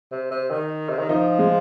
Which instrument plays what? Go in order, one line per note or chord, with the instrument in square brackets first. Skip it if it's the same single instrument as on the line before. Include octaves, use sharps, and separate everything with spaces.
[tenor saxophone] C3
C3
D#3
C3
D#3
[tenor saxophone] F3 [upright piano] D#4
[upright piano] G#3